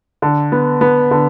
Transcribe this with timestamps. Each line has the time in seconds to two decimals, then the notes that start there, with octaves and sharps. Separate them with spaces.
0.22 D3
0.52 B3
0.81 B3
1.11 D3